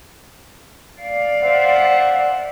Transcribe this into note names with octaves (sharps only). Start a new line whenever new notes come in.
D5 F5
C5 E5 F#5